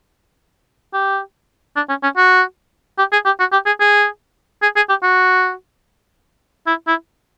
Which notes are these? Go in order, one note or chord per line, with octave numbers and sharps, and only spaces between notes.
G4
D4
C#4
C#4
F#4
G4
G#4
G4
F#4
G4
G#4
G#4
G#4
G#4
G4
F#4
E4
E4